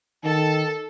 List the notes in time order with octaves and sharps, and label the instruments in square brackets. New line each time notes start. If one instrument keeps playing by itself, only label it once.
[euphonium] D#3 [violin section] A4